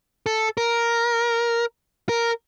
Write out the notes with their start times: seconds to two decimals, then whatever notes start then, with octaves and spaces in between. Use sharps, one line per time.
0.26 A4
0.58 A#4
2.09 A#4